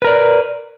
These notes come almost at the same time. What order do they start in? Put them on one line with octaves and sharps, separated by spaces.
B4 A#4 D5